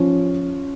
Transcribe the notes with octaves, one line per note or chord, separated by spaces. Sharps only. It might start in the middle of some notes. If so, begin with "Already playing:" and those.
Already playing: F3 C#4